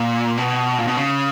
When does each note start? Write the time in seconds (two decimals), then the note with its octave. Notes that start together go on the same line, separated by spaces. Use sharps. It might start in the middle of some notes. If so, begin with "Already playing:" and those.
Already playing: A#2
0.37 B2
0.78 A#2
0.87 B2
0.97 C#3